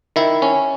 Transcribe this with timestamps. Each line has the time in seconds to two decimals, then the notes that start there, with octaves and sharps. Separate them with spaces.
0.16 D#3 E4
0.42 C#4